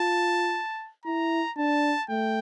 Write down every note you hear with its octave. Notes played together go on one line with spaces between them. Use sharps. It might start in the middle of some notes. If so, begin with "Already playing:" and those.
Already playing: F4 A5
E4 A#5
D4 A5
A3 G5